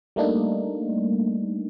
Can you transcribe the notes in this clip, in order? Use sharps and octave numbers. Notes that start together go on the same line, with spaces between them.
G3 A3 A#3 D4 D#4